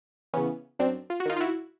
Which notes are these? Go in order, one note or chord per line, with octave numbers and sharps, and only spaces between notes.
C#3 E3 B3 C#4
F#2 C4 D4
F4
F#4
D#3 D#4 F4
F4
E4 F#4